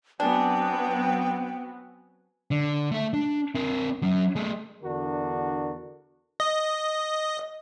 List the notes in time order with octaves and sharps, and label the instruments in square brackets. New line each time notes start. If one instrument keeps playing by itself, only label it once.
[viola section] F#3 B3 C4 [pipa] D4 [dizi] G5 [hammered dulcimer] G#5
[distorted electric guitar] D3
A3 E5
D4
C4 A#4
F#3 C#4
A3 G#4
[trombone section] E2 D3 D4 F#4 A#4
[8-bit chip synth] D#5